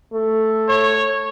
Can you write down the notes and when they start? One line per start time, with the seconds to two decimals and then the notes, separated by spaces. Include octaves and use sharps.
0.13 A3
0.69 C#5